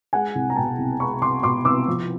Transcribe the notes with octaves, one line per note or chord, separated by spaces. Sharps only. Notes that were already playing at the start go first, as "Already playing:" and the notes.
G#3 F#5 G#5
C2
A#5
B2 G5 A5
C2
G#3 B5 C#6
C2 C6 D6
B2 C6 D6
C2 D6 E6
F3